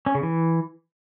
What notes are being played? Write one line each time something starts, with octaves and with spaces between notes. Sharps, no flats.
C#4
C#3
E3